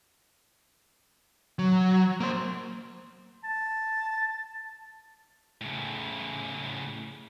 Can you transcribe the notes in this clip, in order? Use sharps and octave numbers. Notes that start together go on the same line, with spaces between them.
F#3
A#3 C5
A5
A2 C#3